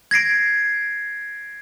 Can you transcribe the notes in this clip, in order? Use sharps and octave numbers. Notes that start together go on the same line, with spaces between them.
G#6 A#6 C7 D7